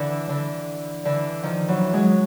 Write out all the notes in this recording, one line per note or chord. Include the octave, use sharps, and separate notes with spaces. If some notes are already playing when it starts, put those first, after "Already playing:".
Already playing: D3 E3
D3 E3
D3 E3
D#3 F3
E3 F#3
F#3 G#3